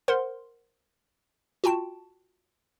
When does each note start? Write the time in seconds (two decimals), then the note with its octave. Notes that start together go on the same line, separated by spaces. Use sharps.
0.08 A#4 C5 F#5 C6
1.64 F4 F#4 G5 A5